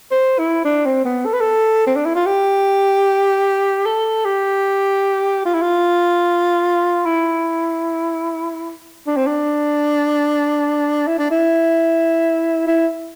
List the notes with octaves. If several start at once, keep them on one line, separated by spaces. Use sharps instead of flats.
C5
E4
D4
C4
B3
A4
B4
A4
C4
D4
E4
F4
G4
A4
G4
F4
E4
F4
E4
D4
C4
D4
E4
D4
E4
E4